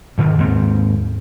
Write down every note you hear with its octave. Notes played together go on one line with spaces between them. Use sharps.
D2 G#2 D#3
D#2 G#2 C4